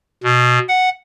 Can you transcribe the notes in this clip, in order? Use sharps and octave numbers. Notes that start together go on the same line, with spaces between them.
B2
F#5